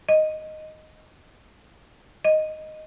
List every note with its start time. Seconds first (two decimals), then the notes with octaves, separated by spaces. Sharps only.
0.09 D#5
2.25 D#5